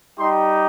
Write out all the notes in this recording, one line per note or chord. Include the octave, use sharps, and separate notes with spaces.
G3 D#4 G4 C6